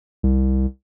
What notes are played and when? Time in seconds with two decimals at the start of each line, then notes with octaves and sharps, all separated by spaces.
0.23 C2